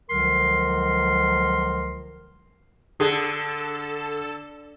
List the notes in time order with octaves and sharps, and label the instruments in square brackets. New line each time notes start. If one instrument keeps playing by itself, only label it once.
[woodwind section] C#2 D3 F3 F#3 A#4 C6
[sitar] D3 [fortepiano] G#4 [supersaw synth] A4 E6